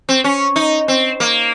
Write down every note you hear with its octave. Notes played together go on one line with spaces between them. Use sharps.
C4
C#4
D#4
C4
A#3